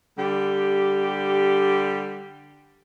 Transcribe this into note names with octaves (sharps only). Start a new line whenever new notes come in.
D3 G3 G4